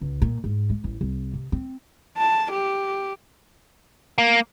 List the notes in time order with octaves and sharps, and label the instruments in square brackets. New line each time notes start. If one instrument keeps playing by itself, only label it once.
[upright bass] C#2
A#2
G#2
G#3
A1
C2
C3
C4
[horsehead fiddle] A5
G4
[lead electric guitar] A#3